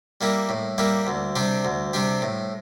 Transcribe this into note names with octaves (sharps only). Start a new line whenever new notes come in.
G3 A#3 E4 G4
A2
G3 A#3 E4 G4
D2
C3 G3 D4 G4
D2
C3 G3 D4 G4
A2